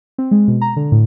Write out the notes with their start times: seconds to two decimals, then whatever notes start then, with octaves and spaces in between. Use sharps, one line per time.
0.18 C4
0.31 G#3
0.48 B2
0.62 A#5
0.76 D3
0.92 A2